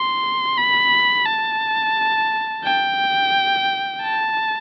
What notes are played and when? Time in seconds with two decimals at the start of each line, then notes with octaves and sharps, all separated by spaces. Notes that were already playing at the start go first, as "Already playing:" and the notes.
Already playing: C6
0.58 B5
1.26 A5
2.64 G5
4.02 A5